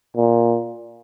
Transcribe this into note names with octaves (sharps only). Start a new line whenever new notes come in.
A#2